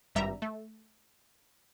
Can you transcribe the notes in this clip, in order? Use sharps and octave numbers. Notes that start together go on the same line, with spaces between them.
G#1 G2 G3 E5 A#5
A3